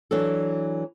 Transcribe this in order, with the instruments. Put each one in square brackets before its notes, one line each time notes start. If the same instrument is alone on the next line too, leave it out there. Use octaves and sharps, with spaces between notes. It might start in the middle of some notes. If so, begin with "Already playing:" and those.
[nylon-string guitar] E3 F#3 D4 A4